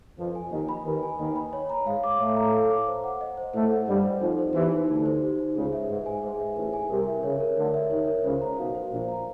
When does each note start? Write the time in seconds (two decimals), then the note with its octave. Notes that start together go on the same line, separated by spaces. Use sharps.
0.19 F2 F3 B4
0.35 G#5
0.52 D#2 D#3 D#5
0.69 B5
0.85 D#2 D#3 B4
1.03 G#5
1.19 D#2 D#3 D#5
1.36 B5
1.53 C#5
1.70 A#5
1.87 G#2 G#3 F5
2.04 D6
2.19 A2 A3 C#5
2.36 A#5
2.54 F5
2.70 D6
2.87 C5
3.04 F#5
3.21 D#5
3.37 C5
3.54 A2 A3 C5
3.71 F#5
3.88 G2 G3 D#5
4.04 C5
4.21 F2 F3 D#4
4.39 C5
4.54 E2 E3 G4
4.71 D#4
4.88 D2 D3 D#4
5.06 C5
5.22 G4
5.38 D#4
5.56 C#2 C#3 G#4
5.73 E5
5.89 G#2 B4
6.06 G#5
6.23 G#2 G#4
6.40 E5
6.56 A1 A2 B4
6.73 G#5
6.90 C2 C3 A#4
7.07 E5
7.23 C#2 C#3 C#5
7.40 A#4
7.57 D2 D3 A#4
7.74 E5
7.91 D#2 D#3 C#5
8.08 A#4
8.24 C#2 C#3 C5
8.41 A#5
8.58 B1 B2 F5
8.75 C5
8.91 A#1 A#2 C5
9.08 A#5